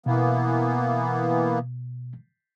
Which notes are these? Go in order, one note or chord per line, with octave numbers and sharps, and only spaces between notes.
B2 E3 A#3 B3